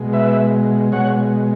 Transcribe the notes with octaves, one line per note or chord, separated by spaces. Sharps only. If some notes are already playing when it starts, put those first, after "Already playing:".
Already playing: B2 G#3
B4 E5
B2 G#3 C#5 F#5